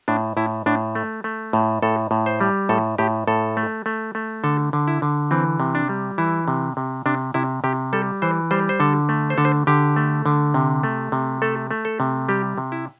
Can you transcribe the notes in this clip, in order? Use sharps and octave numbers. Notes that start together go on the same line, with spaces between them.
A2 D4
A2 E4
A2 D4
A3
A3
A2
A2 A4
A2
C5
G3
A2 A4
A2 G4
A2 A4
A3
A3
A3
D3 A4
D3
E4
D3
E3 C4
C3
D4
G3
E3 E4
C3
C3
C3 D4
C3 E4
C3 G4
G3 A4
E3 C5
G3 C5
C5
D3 A4
A3
C5
D3 A4
C5
D3 G4
A3
D3
C3
A3
C3
A3 A4
A3
A4
C3
G3 G4
C3
E4